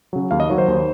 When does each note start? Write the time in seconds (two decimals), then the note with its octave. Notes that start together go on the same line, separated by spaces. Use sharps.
0.13 C#3 F#3
0.31 D#2 F5
0.40 D#5
0.50 D#3 F#3 C#5
0.58 C5
0.68 D#2